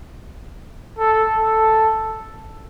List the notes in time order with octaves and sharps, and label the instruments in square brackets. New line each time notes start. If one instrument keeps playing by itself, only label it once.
[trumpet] A4
A4